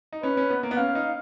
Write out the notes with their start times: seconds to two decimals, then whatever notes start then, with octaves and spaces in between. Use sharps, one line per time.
0.12 D#4
0.23 C#4 B4
0.37 C#4
0.50 B3
0.63 A#3
0.71 B3
0.77 C#4 F5
0.95 D#4